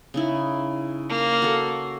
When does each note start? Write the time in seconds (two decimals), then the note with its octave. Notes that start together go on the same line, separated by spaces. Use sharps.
0.14 C#3 D#4 E4
1.09 A#3
1.42 F#4 A4